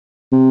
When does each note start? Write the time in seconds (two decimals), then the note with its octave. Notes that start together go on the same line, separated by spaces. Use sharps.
0.32 C3